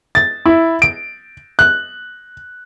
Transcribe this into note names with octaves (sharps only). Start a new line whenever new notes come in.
A6
E4
D7
F#6